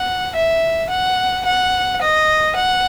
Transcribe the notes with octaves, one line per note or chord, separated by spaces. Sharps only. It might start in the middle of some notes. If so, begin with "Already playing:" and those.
Already playing: F#5
E5
F#5
F#5
D#5
F#5